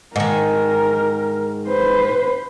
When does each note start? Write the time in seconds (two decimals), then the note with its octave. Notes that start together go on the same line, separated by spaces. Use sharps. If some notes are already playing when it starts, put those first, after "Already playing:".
0.16 G#2 D#3 A#4
1.67 B4 C5